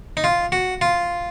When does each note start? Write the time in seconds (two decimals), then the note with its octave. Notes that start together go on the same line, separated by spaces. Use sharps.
0.17 D#4
0.24 F4
0.52 F#4
0.81 F4